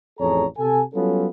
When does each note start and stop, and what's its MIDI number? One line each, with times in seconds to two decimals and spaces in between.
0.20 0.45 33
0.20 0.45 41
0.20 0.45 68
0.20 0.45 69
0.20 0.45 73
0.20 0.45 82
0.58 0.81 48
0.58 0.81 69
0.58 0.81 80
0.94 1.27 54
0.94 1.27 55
0.94 1.27 59
0.94 1.27 61
0.94 1.27 65
0.94 1.27 69